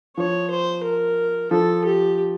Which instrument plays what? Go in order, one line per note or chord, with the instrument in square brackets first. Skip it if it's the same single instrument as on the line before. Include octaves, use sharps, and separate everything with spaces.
[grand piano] F3 [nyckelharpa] C#5
[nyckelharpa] C5
A#4
[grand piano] F3 [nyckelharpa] A4
[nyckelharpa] G4